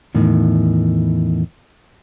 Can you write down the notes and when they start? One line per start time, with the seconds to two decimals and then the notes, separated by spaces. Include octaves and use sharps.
0.15 E2 A2 D#3